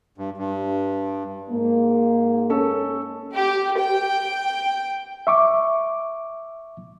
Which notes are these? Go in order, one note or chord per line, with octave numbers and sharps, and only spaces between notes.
G2
G2
G#2 A#3
C#4 A4
G4
G5
E5 C#6 D6